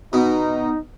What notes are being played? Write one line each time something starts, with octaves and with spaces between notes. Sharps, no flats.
B2 D#4